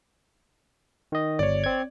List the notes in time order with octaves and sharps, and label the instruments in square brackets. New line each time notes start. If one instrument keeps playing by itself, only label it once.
[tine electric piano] D#3 D#5
[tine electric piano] G1 [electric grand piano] C#5 D5
[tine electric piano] C4 G#6